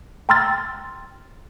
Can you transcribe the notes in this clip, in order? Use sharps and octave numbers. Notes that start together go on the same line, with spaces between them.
G5 A#5 C6 E6 F6 A6